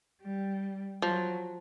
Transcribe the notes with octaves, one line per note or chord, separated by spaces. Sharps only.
G3
F3 F#3